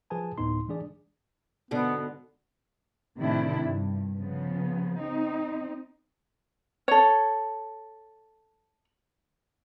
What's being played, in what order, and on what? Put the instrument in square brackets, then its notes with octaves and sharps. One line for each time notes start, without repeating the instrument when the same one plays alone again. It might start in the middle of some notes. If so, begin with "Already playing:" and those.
[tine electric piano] F3 G#4 B4 G#5 A5
D2 A2 B3 D#4 C6
E3 G#3 D4 G#4 D5
[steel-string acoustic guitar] G#2 B2 D3 [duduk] B3
[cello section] A2 C3 D#3 D4 E4
G2
C#3 F3 B3
C4 D#4
[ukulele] A4 C#5